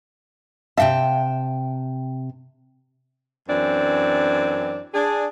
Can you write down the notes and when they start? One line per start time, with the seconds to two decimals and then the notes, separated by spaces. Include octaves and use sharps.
0.77 C3 E5 F5 G5 A5
3.49 F#2 E3 C4 D4
4.94 D4 G#4